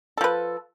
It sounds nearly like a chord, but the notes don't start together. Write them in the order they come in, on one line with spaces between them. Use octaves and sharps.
A4 F3 B4